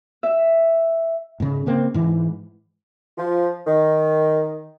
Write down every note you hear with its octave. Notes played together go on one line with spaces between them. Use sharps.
E5
G#2 C#3
C#3 A#3 C4
G#2 E3
F3
D#3